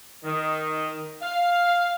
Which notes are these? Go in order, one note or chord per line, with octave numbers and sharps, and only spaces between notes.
D#3
F5